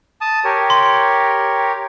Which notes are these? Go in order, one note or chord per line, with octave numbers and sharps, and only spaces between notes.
A5 D#6
G4 A#4 C#5
C6